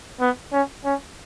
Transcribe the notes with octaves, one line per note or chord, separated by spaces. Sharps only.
B3
C#4
C#4